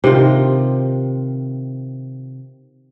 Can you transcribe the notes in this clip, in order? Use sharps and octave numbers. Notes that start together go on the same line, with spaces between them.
C3 D#3 F4